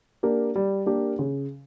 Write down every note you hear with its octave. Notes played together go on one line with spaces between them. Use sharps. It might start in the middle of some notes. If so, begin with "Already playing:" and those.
A#3 D4 G4 A#4
G3
A#3 D4 G4 A#4
C#3